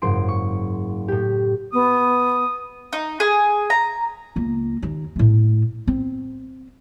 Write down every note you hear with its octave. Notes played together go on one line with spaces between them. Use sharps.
F#1 G#2 C6 D7
C#6
A2 G4
B3 D#6
D#4
G#4
A#5
C#2 A#3
D#2
A2 A3
C4